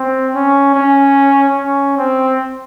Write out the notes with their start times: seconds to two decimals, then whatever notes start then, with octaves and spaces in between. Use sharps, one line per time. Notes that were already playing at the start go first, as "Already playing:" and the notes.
Already playing: C4
0.34 C#4
0.74 C#4
1.56 C#4
1.97 C4